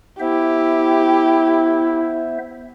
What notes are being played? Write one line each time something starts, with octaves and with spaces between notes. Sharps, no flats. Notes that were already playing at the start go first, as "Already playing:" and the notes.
B3 E4 G4 C5 E5